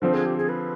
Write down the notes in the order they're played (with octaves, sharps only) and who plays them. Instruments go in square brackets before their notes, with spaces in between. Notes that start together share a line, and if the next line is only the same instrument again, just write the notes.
[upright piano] D3 F3 C4 [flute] C5
[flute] G#4
G4
G#4
B4